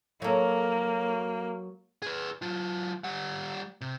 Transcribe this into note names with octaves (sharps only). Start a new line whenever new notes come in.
F#3 A#3 A4
G#4 B4
F#3 F4
G3 F#5
C3